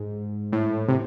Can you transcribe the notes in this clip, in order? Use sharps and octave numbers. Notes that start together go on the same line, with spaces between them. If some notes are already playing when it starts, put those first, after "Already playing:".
Already playing: G#2
A2
C3